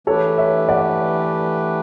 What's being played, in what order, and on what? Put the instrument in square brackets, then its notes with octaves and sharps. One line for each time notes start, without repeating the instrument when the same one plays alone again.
[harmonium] E3 A3 D4 G4 B4 [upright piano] A4 C#5
[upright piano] C#5 E5
D5 F#5